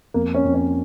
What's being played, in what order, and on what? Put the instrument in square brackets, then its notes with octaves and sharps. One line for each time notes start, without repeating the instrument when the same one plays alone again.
[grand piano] F2 A#3
C#4
F2
C#4